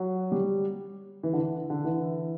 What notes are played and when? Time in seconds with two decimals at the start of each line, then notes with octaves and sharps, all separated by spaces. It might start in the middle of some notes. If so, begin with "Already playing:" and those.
Already playing: F#3
0.32 G3
1.23 E3
1.33 D3
1.39 E3
1.70 D3
1.85 E3